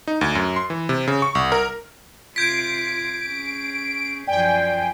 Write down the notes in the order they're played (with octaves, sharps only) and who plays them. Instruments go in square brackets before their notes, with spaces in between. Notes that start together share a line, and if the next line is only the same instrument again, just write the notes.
[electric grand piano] D#4
D2
F#2
C6
E3
C3
C#3
C#6
C2
A#4
[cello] C3 F4 [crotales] G6 G#6 B6 [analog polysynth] D7
[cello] C#4 G#4
[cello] F#2 F3 [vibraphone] D5 [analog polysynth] G5 G#5